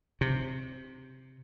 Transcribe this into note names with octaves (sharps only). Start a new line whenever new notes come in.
C3